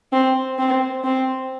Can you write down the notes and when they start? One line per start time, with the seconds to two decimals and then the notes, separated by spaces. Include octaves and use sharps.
0.13 C4
0.59 C4
1.04 C4